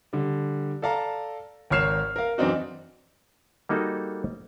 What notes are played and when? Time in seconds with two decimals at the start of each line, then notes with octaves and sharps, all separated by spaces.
0.13 D3 G3
0.82 A4 D5 F5 A5 A#5
1.70 G#1 A#4 C#5 F6 C7 E7
2.16 A#4 F5
2.38 F#2 E3 C4 D4 D#4 F#4
3.69 G3 A#3 D#4 F#4 A4